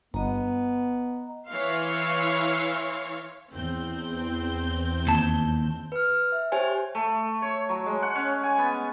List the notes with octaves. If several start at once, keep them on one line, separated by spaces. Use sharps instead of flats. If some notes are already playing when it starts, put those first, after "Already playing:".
G1 B3 D#5 A#5
E3 C#5 F5 C6
E2 C4 G6
D#2 A5
B4 F6
E5
G4 C5 C#5 G#5
A3
C#5
F#3
G#3
F#5
C#4
G#5
B3